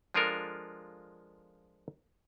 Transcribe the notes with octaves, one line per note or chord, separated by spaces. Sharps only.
F3 G#3 D4 F4 A4 A#4